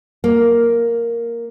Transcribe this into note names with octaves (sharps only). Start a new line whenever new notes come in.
A#3